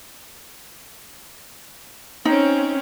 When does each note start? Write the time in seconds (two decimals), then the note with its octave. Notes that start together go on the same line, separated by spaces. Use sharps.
2.25 C4 C#4 D#4